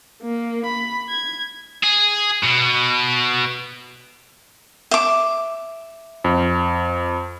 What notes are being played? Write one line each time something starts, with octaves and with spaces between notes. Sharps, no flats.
A#3
B5
G#6
G#4
B2
E5 D6
F2